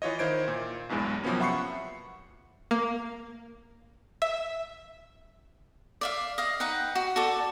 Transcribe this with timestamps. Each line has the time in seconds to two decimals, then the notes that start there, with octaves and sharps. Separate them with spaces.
0.02 E3 F4 C#5 D#5
0.19 D#3 E4 C5 G#6 D7
0.48 A#2
0.89 B1 E2 G2 E3 G#3
1.24 C3 F3 F#3 A#3 B3 C#4
1.40 E5 F#5 B5 C#6 C7 C#7
2.71 A#3
4.22 E5
6.01 D5 E5 F5
6.38 D#5 F5
6.60 D#4 B4 F#5 G5
6.95 F#4
7.16 F#4 A4 D5